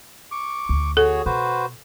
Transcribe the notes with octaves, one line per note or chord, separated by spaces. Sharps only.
C#6 D6
D2
F#4 G#4 A4 C#5
B2 F#4 B4 C5